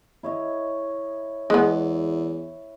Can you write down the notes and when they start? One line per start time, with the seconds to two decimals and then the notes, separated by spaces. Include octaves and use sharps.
0.23 E4 C#5 D#5
1.50 E2 G#3 B3